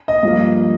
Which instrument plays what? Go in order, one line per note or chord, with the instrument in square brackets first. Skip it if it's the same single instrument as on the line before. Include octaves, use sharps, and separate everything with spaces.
[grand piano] D#5
G2 F3 A#3